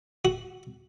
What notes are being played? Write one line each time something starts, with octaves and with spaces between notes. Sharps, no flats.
F#4